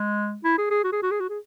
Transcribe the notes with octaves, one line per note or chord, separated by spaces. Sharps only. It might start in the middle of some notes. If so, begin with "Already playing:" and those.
Already playing: G#3
E4
G#4
G#4
F#4
G#4
F#4
G#4
F#4
G#4